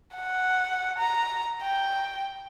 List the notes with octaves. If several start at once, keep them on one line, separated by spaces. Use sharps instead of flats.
F#5
A#5
G5